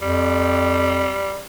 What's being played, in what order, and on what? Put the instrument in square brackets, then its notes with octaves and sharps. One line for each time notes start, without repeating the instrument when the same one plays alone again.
[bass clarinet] F2 [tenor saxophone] G3